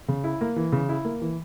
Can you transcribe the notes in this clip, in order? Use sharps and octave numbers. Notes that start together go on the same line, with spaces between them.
C#3
E4
A#3
E3
C#3
E4
A#3
E3